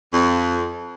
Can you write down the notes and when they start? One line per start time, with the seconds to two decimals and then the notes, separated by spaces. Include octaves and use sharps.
0.12 F2